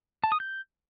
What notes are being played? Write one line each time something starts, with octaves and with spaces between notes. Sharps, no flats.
A5
D#6
G6